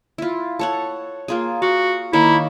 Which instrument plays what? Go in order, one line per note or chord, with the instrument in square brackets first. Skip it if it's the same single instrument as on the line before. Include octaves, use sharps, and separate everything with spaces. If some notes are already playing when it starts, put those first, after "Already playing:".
[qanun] E4 F4
A4 C#5 F#5
A#3 F4 G#4
[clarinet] F#4 [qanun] F5
[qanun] D#3 A#3 C#5 [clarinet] E4